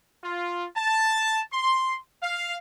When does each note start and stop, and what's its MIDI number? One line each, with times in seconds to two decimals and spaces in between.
0.24 0.65 65
0.77 1.41 81
1.53 1.96 84
2.23 2.56 77